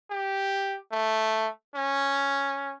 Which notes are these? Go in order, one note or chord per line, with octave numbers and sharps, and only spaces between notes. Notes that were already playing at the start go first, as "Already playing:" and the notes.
G4
A3
C#4